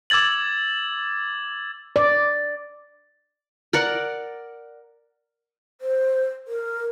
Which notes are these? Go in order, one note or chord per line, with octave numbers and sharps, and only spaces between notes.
D6 E6 G#6 A6 F#7
D5
A#4 D5 F#5
C5
A#4